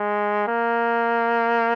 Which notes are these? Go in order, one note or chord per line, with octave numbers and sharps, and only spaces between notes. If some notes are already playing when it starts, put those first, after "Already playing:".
Already playing: G#3
A#3